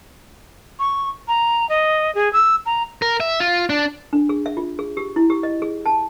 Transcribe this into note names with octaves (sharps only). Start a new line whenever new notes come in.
C#6
A#5
D#5
G#4
E6
A#5
A#4
E5
F4
D4
D4
G#4
E5
F4
G#4
G4
E4
G4
D#5
G#4
A5